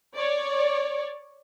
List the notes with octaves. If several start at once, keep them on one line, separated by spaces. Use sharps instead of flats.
C#5 D5